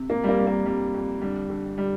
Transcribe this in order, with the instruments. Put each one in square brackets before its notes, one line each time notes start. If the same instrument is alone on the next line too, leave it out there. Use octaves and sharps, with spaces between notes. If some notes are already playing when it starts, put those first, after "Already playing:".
Already playing: [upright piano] C3
F2 A#3
G3
A#3
F2 G3
A#3
F2 G3
F2
D3 G3
D3
G3